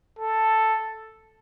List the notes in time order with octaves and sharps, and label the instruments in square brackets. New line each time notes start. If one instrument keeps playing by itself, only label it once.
[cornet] A4